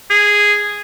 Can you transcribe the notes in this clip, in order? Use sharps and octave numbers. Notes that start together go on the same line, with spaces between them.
G#4